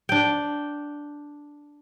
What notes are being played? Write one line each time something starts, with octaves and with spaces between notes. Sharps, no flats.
D4 G5